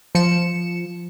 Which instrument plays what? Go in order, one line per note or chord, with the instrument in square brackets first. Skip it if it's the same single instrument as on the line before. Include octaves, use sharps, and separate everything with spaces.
[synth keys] F3 C#7 E7